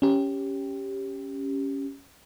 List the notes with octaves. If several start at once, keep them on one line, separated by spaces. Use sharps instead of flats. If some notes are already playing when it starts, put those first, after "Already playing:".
C#4 G4